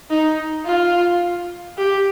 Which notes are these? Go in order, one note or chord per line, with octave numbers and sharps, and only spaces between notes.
D#4
F4
G4